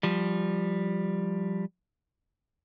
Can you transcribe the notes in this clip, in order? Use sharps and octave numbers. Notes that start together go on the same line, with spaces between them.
F3 G3